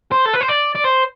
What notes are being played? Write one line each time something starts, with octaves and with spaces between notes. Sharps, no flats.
C5
A4
B4
C5
D5
D5
C5